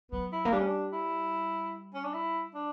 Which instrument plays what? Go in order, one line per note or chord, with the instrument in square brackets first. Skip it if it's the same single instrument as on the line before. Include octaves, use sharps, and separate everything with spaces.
[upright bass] F#3 [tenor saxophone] B3
[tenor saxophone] E4
[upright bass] A#3
[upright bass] G3 [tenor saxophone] D4
[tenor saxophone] C#4
D4
E4
C#4
D4
E4
D4